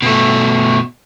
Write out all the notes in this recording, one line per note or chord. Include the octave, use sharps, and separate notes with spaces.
B2 A3